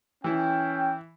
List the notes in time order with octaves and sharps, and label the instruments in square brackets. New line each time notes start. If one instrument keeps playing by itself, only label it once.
[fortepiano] E3 E4 [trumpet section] C#4 G5